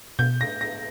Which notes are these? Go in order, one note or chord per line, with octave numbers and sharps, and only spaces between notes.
B2 G6
A#6
A#6